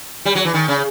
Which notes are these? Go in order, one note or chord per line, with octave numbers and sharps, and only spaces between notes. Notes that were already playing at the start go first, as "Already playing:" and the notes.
G3
F#3
E3
D#3
C#3